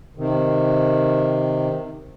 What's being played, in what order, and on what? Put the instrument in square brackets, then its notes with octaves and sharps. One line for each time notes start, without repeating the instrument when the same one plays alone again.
[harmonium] C3 D#3